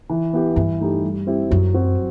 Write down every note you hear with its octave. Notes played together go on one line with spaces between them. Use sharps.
E3
B3 E4 G4
G2 E3
A3 D#4 G4
G3
C4 E4 G4
F#2 F#3
C4 F#4